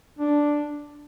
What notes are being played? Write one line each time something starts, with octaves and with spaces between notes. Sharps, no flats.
D4